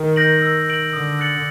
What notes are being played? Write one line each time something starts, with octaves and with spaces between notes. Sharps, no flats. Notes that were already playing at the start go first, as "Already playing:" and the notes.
Already playing: D#3
G6 A#6 D7 F#7
E6
G6 A#6 D7 F#7
D3 D#6
F#6 A6 C#7 F#7